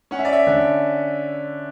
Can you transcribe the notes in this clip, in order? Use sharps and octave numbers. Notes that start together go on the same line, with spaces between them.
C#4 F#5
E5
D5
E5
D3 D5